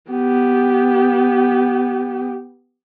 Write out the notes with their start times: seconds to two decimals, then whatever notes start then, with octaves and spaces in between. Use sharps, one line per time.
0.10 B3 G4